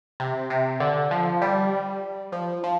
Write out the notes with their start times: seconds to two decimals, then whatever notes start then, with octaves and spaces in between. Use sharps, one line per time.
0.20 C3
0.50 C3
0.80 D3
1.11 F3
1.42 G3
2.32 F3
2.64 F3